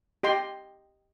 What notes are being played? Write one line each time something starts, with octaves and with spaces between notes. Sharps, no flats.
G4 D#5 G5 C6